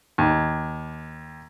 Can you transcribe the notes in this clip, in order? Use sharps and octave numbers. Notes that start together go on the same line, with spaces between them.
D#2